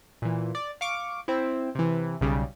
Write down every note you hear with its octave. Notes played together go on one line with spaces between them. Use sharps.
A#2 E3
D5
F5 C#6 D6
C4 E4
C3 E3
B1 C#3 G3